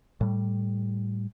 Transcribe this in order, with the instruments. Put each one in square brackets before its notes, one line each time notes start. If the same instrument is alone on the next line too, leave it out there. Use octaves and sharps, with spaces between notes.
[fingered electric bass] A2 G3